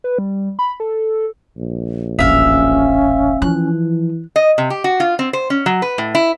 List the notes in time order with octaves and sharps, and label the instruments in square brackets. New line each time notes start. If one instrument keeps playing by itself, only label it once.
[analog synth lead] B4
G3
B5
A4
[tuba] A#1
[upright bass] D#1 A1 [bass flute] C#4 [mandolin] E5 F5
[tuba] E3 [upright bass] F3 [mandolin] F#6
[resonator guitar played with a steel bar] D#5
C3
G4
F#4
F4
C4
C5
C#4
F#3
B4
A2
E4